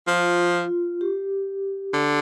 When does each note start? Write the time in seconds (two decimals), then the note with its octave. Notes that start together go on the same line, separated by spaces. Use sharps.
0.07 F3 F4
0.54 F4
1.01 G4
1.94 D3